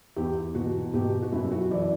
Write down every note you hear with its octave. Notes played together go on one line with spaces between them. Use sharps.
E2 G4
B2 F#4
B2 G4
F#4
F#2 E4
F#4
E3 D5